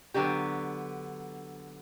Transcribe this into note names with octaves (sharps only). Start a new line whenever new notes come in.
D3 F#3 B3 G4